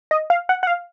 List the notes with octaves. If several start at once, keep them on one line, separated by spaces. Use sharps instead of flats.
D#5
F5
F#5
F#5
F5